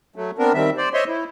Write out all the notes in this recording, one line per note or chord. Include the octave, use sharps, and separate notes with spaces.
F#3 A3
B3 C4 D4 A#4
D#3 G3 C4 E5
C5 D5
C5 C#5 D#5 E5 C6
E4